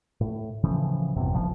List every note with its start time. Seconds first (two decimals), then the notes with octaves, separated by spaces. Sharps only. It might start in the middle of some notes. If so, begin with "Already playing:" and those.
0.21 A2
0.63 A2 C#3 E3 F3
1.15 G1 E2 C3
1.33 D#1 A1 C#3 F3